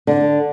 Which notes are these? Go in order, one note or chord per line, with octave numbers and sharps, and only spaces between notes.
D3